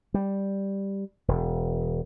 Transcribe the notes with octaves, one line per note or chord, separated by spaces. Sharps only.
G3
E1